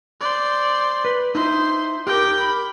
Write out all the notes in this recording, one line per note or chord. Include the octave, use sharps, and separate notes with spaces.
C5 D5
B4
D#4 E4 C5
G4 A#4 G5 D6
B5